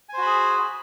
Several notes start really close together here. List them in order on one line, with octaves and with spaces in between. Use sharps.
G#5 C5 F#4 B5 G#4